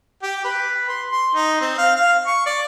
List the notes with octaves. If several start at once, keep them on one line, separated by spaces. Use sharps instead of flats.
G4
B4
C6
C6
D#4
C4
F5
F5
C#6
D5